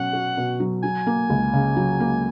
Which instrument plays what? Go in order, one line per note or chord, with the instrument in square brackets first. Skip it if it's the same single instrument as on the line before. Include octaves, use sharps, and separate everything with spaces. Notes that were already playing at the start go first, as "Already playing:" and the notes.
Already playing: [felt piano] B2 F#3 C#4 [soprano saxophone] F#5
[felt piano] F#4
B2
F#3
[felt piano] F#3 [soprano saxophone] G#5
[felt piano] A#3
C#2
C#3
F#3
A#3